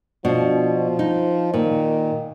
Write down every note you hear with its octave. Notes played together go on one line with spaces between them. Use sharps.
B2 F3 D4
D#4
A#2 D#3